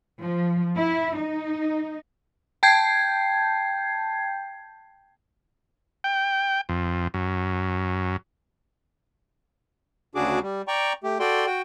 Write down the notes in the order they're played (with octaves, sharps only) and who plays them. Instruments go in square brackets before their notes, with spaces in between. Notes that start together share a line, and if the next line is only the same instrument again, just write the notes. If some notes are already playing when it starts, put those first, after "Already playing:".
[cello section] F3
E4
D#4
[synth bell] G5 A5 G6 G#6 C7
[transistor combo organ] G5
F2
F#2
[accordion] D2 C#3 D4 F#4 G#4 D6
G3
D5 G5 A#5 C#6
A3 G4
F#4 A4 D5 G5 C6
F#4 G5